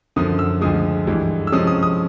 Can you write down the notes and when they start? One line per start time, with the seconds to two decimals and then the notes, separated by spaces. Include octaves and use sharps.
0.16 F#2 D3 F3 D#6
0.39 E6
0.61 D2 D3 F3 G#3 D#6
1.07 G2 E3 G#3
1.47 E6
1.52 C3 F3 G#3 C#4 D#6
1.67 D#6
1.83 D#6